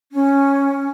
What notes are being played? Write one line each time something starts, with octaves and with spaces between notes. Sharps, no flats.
C#4